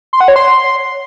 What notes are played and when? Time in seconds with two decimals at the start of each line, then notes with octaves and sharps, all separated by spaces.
0.13 C6
0.21 F#5
0.28 C#5
0.36 C6